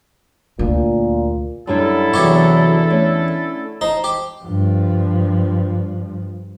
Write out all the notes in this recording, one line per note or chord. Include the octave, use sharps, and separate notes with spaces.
D2 A#2
F#2 D3 G3 D4 E4 A4
E2 C3 E3 F#3 G4 C#5
A3 C#4
D#4 C5 A5
G4
G2 F3